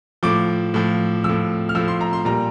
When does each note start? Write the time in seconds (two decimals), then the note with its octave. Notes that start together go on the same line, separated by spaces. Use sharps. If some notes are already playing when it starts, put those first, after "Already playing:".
0.23 A2 F3 D6
0.74 A2 F3
1.24 A2 F3 E6
1.69 F6
1.75 A2 F3 E6
1.88 C6
2.01 A#5
2.13 C6
2.25 A#2 G3 A#5